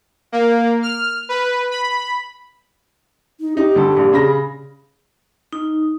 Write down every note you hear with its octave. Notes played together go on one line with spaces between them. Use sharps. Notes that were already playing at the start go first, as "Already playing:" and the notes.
A#3
F6
B4
B5
D#4
D#4 G4
D2 G3 A4
A#1
C#3 B5 A#6
D#4